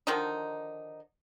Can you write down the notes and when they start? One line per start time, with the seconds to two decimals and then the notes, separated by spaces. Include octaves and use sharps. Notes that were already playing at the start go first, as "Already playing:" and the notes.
0.07 D3 D#3 F3 D#4